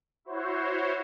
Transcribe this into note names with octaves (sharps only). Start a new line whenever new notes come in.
E4 F#4 C5 C#5